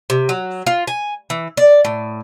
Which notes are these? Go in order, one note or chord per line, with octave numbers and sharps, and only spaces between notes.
C3
F#3
F4
G#5
E3
D5
A2